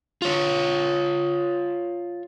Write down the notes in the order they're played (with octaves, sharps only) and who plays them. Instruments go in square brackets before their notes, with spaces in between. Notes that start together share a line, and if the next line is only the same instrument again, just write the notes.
[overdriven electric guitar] F4 C#5